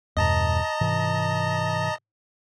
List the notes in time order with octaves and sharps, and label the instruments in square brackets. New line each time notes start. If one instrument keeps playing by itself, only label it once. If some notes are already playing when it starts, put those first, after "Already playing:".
[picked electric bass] E2 G2 B2 [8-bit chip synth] D#5 A5 A#5
[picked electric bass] G#2 C3 E3